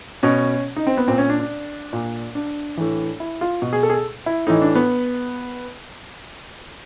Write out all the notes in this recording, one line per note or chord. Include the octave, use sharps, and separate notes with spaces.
B2 C#4
D#4
C4
B3
A#2 C4
C#4
D4
D4
A#2
D4
A2 E3
E4
F4
B2
G#4
A4
G#4
A4
E4
A2 E3 D#4
D4
B3